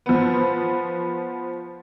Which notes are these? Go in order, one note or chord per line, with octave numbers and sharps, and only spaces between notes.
F3 B3